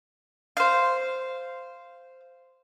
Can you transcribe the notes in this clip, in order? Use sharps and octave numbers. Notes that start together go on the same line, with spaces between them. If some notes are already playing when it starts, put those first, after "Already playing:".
C5 F5